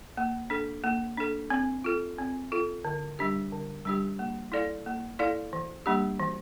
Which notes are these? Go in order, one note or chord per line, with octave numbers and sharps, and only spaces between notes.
A#3
D4 A4
A#3
D4 A4
C4
F4 A4
C4
F4 A4
D3
G3 D4 G4
D3
G3 D4 G4
A#3
E4 A4 D5 F5
A#3
E4 A4 D5 F5
E3
G3 A#3 D4 G4
E3